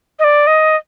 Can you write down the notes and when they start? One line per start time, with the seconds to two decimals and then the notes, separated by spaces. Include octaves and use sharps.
0.19 D#5
0.24 D5
0.47 D#5